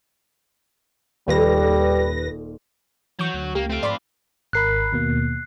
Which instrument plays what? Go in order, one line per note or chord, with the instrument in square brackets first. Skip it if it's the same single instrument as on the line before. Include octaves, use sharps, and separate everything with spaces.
[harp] D#1 F4 A4 [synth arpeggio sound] D#2 B4 A#6 [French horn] G3
[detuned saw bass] E3 [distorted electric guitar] F#3 [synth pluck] C#6 G6
[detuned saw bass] D2
[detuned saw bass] C#2 [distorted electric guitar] A#3 [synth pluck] G4
[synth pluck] A3 D7 [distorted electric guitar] C4 F4
[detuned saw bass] G#2 [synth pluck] D5 B5 C6
[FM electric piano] G#1 A#4 B5 [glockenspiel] F#6 C7
[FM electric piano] D#2 B2 A#3